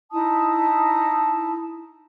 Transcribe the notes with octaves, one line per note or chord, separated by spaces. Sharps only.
D#4 E4 A5 D#6